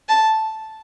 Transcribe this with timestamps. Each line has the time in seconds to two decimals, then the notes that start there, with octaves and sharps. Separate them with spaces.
0.09 A5